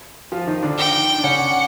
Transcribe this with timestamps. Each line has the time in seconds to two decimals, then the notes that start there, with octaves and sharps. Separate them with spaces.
0.32 F3 F4
0.47 D#3 D#4
0.63 D3 D4
0.78 G5
1.18 D4
1.24 C#3 C#4 F#5